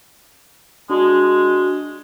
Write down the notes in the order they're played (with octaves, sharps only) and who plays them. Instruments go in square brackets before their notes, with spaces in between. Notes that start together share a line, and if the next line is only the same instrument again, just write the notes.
[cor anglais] G#3 [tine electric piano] D4 F#4